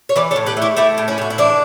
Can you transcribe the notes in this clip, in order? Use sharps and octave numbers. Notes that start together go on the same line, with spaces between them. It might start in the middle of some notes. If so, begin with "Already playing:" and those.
C#5
E3 B4 D5
A4 C#5
A2
G4 B4
A3
E4 G4
A3 E4 G4
A2
C#4 E4
A2 F#4
E4
E3 D4